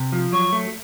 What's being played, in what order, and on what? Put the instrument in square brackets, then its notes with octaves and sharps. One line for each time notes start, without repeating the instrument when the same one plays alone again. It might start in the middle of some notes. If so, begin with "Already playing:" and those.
Already playing: [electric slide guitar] C3
F3
[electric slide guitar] F#3 [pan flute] C#6
[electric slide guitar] A3